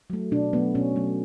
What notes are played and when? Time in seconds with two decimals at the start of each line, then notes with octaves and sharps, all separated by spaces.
0.10 F#3 A3
0.32 B2 D4
0.53 F#3 A3 B3
0.75 B2 C#4
0.96 F#3 A3